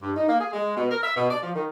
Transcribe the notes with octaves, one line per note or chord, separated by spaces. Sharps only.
G2
D#4
A#3
G#4
G#3
B2
A#4
E5
B2
D5
F3
D#3